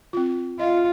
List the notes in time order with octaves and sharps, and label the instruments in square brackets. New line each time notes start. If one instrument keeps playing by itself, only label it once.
[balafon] C4 F4
[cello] F4 [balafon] D#5 E5